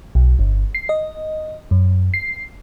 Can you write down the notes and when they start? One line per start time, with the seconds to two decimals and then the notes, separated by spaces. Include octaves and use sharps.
0.15 B1
0.39 G1
0.75 C7
0.89 D#5
1.71 F#2
2.14 C7